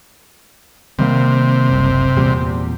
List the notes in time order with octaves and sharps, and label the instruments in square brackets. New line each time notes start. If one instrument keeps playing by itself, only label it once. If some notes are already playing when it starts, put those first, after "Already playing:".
[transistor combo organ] C3 [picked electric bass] D#3 G3 A#3
[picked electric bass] F#1 C2
E2 A#2 G3